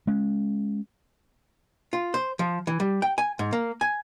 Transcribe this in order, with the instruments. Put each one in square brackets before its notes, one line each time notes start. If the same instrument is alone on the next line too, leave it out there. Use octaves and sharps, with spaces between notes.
[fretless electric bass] G#3 C#4
[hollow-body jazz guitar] F4
C5
F3
E3
G3
G5
G#5
G#2
A#3
G#5